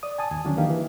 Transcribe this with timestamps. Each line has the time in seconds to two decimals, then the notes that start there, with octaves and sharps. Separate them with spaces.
0.03 D5 D#6
0.18 G#5 A5 D#6
0.31 D#2 G#5
0.45 D3 D#3 F#3 C#4 D4
0.57 D#3 E3 A#3 G4 F5
0.70 E3